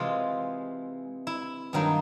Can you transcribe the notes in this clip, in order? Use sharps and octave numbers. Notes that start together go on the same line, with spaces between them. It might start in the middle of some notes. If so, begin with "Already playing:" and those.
Already playing: C3 E3 G#3 F4
E4
G2 D#3 F#3 A#3